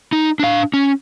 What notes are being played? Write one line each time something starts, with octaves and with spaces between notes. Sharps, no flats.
D#4
D4 F5
C#4